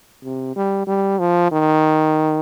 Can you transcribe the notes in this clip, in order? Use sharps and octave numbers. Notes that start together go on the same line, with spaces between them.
C3
G3
G3
F3
D#3